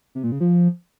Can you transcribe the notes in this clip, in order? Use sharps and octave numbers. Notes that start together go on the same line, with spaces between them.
C3
A#2
C#3
F3